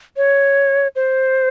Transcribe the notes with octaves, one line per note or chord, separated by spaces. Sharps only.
C#5
C5